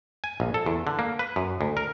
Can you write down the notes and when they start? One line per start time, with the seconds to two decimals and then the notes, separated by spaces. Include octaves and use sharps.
0.24 G#5
0.40 A#1
0.54 A4
0.66 E2
0.87 D3
0.99 A#3
1.19 B4
1.36 F#2
1.61 D2
1.77 A#4